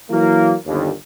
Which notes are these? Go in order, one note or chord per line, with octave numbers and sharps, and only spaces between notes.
E3 F#3 A#3
G1 D#2